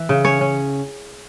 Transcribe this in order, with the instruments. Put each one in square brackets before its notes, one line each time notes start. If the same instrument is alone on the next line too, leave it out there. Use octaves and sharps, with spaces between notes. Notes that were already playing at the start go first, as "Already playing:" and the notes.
Already playing: [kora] E3 E5
C#3
C#4 C#5
C#4